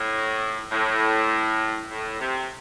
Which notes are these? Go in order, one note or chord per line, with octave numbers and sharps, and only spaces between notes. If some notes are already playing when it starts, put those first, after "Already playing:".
Already playing: A2
A2
A2
C3